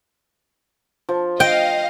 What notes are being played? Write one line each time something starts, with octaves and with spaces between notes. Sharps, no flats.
F3
D#5 F5 G5